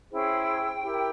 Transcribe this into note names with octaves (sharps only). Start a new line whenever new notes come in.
C#4 E4 G#4 C5 G5
E4 G4 A#4